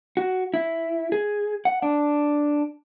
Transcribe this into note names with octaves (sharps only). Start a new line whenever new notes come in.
F#4
E4
G#4
F#5
D4